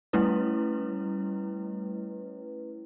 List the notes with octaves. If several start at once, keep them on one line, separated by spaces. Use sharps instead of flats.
G3 A3 C#4 E4 B4